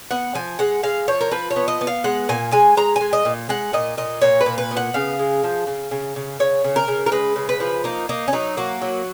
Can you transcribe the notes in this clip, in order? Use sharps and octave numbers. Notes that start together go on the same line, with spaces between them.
B3 F#5
F3 G#5
G#3 F#5
G#3 F5
F3 C#5
A#4
F3 B4
C#5
B3
D#5
B3
F5
G#3 F#5
A#2 G#5
G#3 G#5
G#3 A#5
G#3 G#5
D#5
A#2
G#3 F#5
A#2 D#5
A#2 D#5
A#2 C#5
B4
A#2
B4
B3
F#5
C#3 F5
G#3
F3
C#3
C#3
C#3
C#3 C#5
C#3
A#4
C#3
A#4
G#3 B4
C#3
B4
F3
A#3 D#4
A#3 D#4
C#4
F#3 D#4
A#3 F#4
F#3